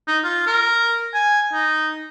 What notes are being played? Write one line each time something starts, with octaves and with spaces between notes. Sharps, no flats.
D#4
F4
A#4
G#5
D#4